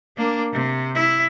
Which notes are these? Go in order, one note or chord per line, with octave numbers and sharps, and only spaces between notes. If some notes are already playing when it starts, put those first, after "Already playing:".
A#3 D4
C3
E4